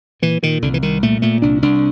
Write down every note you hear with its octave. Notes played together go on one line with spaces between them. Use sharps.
A#2 E3
A#2 D#3
C2 D3
E3
C2 D#3
A#2 A3
A#2 A3
C2 D4
C2 D4